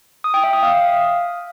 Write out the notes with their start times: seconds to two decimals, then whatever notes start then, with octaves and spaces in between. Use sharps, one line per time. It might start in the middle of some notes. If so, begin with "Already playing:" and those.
0.24 D#6
0.34 G5
0.44 E5
0.53 D#6
0.63 F5